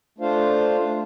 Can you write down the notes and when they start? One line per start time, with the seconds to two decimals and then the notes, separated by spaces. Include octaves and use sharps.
0.18 A3 D4 F4 C5 F5